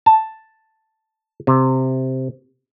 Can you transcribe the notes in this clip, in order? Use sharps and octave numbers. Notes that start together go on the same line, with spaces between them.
A5
C3